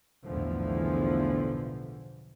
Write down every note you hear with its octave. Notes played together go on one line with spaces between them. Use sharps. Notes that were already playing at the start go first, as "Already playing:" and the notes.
B1 E2 A2 D3 E3 F3